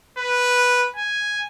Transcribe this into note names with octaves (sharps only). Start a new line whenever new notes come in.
B4
G#5